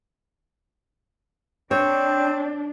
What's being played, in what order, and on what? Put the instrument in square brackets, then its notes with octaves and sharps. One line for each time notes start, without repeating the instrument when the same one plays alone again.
[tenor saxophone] C4 [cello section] D4 [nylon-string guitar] C#5